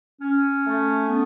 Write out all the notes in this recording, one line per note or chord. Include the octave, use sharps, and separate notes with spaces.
C#4
A3
B3